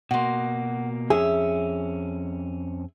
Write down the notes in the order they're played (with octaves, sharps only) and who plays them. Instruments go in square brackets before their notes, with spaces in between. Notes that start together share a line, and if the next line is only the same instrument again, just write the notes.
[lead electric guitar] B2 A#3 [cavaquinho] F#4 C6
[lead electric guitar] F2 C#4 [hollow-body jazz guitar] G#4 [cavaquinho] E5